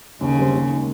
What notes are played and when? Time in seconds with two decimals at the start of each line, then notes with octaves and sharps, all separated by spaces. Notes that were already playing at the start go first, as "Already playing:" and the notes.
0.21 D#2 C#3
0.37 D3 G3 C4
0.54 D#2
0.70 D#3 G#3